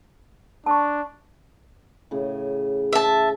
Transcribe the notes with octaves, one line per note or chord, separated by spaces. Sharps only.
D4 A5 C#6
A2 C#3
E5 A5